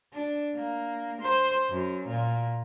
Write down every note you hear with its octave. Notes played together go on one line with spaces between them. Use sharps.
D4
A#3
C5
F#2
A#2